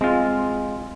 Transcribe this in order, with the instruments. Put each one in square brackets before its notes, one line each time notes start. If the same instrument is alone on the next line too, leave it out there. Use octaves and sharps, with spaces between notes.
[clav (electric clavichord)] G#3 F4 [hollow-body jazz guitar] C4